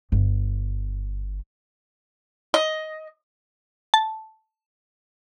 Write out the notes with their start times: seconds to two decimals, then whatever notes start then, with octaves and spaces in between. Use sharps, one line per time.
0.12 G1
2.54 D#5
3.94 A5